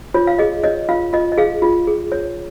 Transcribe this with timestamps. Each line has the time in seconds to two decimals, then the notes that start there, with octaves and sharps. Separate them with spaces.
0.14 F4 C#5
0.27 F5
0.39 G#4 D#5
0.64 C#5 D#5
0.89 F4 F5
1.13 F4 D#5
1.32 D#5
1.38 G#4 F5
1.62 F4
1.87 G#4
2.12 C#5